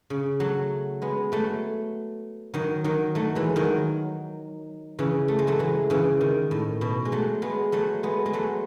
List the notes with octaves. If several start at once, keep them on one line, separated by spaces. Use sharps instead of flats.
C#3
F#3 A3
G#3 B3
F#3 A3
D#3 F#3
D#3 F#3
F#3 A3
E3 G#3
D#3 F#3
C#3 E3
A3
G#3
F#3 A3
E3 G#3
C#3 E3
D#3
A2
B2
G#3
F#3 A3
G#3 B3
F#3 A3
G#3 B3
G#3
F#3 A3